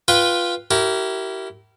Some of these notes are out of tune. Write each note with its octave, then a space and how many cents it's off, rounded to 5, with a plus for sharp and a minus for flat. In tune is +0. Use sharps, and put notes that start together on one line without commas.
F4 +0 B4 -10 G5 +0
E4 +0 G4 -40 A#4 -15